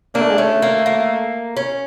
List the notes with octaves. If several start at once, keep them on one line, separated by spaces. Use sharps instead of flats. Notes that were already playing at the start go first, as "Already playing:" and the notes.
A#3 D4
A3
G#3
A3 C#4
A#3
A#3
C#4